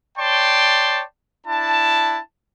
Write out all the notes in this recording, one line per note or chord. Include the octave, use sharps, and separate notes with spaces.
C#5 D5 G5 A5 C6
D4 E4 A5